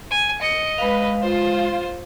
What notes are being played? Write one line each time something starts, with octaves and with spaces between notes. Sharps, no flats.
G#5
D#5 C#7
G#3 B4 F5
F4 C5